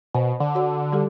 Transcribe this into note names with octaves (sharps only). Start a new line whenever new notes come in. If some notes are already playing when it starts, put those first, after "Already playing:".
B2 C5 G#5
D3
F#4 C#5 F#5
G3 G4 A4